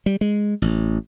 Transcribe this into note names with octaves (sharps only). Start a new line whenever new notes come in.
G3
G#3
A1